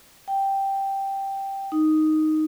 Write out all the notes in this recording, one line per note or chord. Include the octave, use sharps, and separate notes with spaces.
G5
D#4